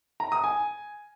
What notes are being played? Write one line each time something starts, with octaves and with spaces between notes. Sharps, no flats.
A#5
D#6
G#5